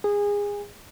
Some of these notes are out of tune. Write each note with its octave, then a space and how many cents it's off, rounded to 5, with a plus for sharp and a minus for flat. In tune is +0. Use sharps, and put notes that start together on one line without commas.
G#4 -25